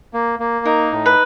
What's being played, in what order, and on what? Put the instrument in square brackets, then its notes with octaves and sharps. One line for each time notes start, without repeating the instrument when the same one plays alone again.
[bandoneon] A#3
A#3
[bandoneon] D#4 [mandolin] A#4
[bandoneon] A2
[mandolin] B4